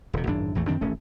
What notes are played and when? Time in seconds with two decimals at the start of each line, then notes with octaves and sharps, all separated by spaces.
0.13 D#1 C3
0.27 G#1 F#2 A2 D4
0.55 A#1 E2 E3 A3
0.67 F#2 D#3 C4 D4
0.81 D#1 A1 A3 C#4